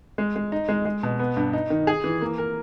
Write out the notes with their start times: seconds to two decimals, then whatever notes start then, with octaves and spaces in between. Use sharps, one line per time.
0.18 G#3
0.36 G#3
0.52 D#4
0.69 G#3
0.85 G#3
1.03 B2
1.19 B3
1.37 G2
1.53 D#4
1.70 D#3
1.87 G#4
2.04 E3
2.21 A#3
2.38 A#4